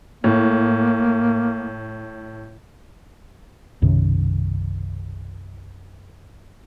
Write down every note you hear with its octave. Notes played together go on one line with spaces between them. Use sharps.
A2 A#3
B1 F#2 C3 D#3